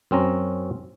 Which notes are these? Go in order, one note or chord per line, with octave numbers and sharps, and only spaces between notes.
F#2 C4 C#4 A#5